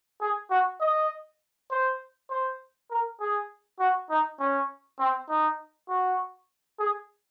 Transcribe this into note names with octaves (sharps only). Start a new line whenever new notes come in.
G#4
F#4
D#5
C5
C5
A#4
G#4
F#4
D#4
C#4
C4
D#4
F#4
G#4